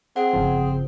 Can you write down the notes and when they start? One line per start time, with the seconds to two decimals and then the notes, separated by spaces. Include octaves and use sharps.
0.16 C4 G#4 F#5
0.33 G1 C#3 F3